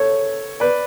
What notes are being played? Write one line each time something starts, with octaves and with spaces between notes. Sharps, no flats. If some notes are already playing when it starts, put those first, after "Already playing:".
Already playing: A4 C#5
B4 D5